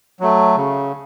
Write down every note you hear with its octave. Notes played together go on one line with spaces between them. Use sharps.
F#3 A3
C#3